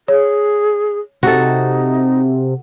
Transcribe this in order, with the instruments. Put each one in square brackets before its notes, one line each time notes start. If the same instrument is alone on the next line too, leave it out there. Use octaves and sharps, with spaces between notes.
[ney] G#4 [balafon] C#5
[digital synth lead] C3 [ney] D#4 [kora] F#4 A4